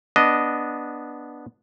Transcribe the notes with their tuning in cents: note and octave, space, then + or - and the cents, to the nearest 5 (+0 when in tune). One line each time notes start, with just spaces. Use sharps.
B3 -10 D4 +0 D#5 +0